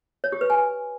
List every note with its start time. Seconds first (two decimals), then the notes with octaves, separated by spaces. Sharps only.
0.24 C#5
0.32 G4
0.41 B4
0.50 G#5